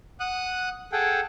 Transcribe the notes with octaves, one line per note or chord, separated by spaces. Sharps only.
F#5 D#6 F#6
G#4 A4 F#5 G5